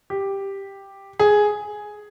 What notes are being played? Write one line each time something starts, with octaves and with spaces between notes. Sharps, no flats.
G4
G#4